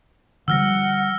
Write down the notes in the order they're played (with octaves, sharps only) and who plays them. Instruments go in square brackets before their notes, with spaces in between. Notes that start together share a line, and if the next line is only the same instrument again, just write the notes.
[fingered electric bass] D3 F3 G3 [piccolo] F#5 [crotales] E6 F6 A#6